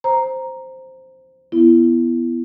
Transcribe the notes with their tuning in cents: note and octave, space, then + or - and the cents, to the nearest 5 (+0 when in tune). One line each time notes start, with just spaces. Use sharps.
C5 +0 A#5 +0
B3 +0 E4 +25